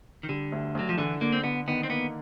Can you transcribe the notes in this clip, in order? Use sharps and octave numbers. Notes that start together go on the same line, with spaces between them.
D#3
D3 G3
D2
D2 F#3
F3
D3 E3
D3 A#3
C4
D3 B3
D#3 B3
C4
A#3 B3